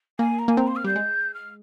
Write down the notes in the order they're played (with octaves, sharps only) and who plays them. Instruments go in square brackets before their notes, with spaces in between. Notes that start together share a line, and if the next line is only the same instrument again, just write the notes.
[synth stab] A#3 [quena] G#5
[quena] A#5
[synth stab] A#3 [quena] G#5
[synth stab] C4 [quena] A#5
[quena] C6
F6
[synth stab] G3 [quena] G6
[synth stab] G#3
[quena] F6